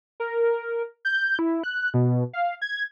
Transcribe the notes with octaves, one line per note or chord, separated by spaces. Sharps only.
A#4
G6
E4
F#6
B2
F5
G#6